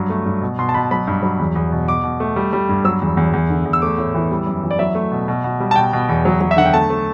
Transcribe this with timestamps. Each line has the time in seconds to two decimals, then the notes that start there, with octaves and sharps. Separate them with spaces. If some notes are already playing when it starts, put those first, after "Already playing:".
Already playing: G2 F#3
0.10 A3
0.26 G2
0.42 B2
0.59 B2 C6
0.69 A5
0.74 B2 B5
0.91 F#3 B5
1.08 G2
1.22 F#3
1.39 E2
1.55 E2
1.72 B2
1.87 B2 D6
2.03 B2
2.20 A3
2.36 G3
2.53 G3
2.69 G2
2.85 F#3 E6
3.02 E2
3.17 E2
3.33 E2
3.49 D3
3.65 E2
3.73 E6
3.82 A3 D6
3.98 A2
4.14 E3
4.31 G3
4.47 F#2
4.63 E3
4.71 D5
4.79 F#3 E5
4.95 A3
5.12 B2
5.28 B2
5.44 B2
5.60 G3
5.71 A5
5.76 B2 G5
5.93 B2
6.09 E2
6.25 F#3
6.41 F#3
6.51 E5
6.57 D3 F#5
6.65 G5
6.74 A3 A5
6.90 A3